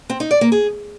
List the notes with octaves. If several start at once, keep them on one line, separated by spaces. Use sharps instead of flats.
C4
D#4
D5
A#3
G#4